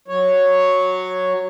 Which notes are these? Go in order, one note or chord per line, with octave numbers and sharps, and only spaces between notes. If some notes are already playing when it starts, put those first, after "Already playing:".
F#3 C#5